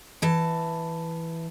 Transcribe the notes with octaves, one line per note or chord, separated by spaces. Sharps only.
E3 A5